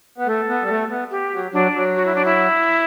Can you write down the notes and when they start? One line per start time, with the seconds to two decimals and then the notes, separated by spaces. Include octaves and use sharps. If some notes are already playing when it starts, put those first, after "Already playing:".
0.18 B3
0.27 A3 A4
0.49 B3
0.62 G3
0.70 A3
0.89 B3
1.11 G4
1.33 F#3
1.53 F#3 D4
1.74 F#3
1.95 F#4
2.05 E4
2.15 D4
2.25 E4